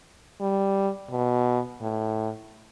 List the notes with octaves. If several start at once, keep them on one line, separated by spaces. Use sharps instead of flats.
G3
B2
A2